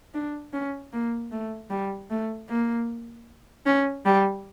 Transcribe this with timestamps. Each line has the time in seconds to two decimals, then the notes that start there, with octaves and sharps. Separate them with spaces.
0.14 D4
0.53 C#4
0.93 A#3
1.32 A3
1.70 G3
2.10 A3
2.49 A#3
3.66 C#4
4.06 G3